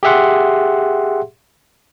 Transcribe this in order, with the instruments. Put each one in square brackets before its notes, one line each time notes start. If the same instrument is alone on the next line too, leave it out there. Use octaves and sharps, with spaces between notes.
[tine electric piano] G4 G#4 E5 F#5 C6